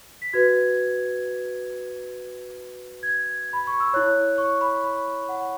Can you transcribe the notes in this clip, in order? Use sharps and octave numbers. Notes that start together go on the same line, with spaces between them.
B6
F#4 B4 G#6
G#6
B5
C#6
E6
E4 C#5 F#6
C#6
B5
B5
F#5